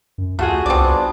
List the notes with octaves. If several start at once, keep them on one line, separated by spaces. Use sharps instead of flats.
F#2
D2 A3 F4 F#4 G#4
C2 B3 C4 D4 D5